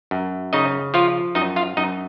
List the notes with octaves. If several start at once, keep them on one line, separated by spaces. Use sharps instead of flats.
F#2
C#3 D#4 D#5
F3 F4 F5
F#2 D#4 D#5
F4 F5
F#2 D#4 D#5